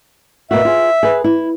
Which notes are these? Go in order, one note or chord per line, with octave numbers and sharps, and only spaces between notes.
B2 A#3 F#4 E5
F4 G#4
G#4 B4
E4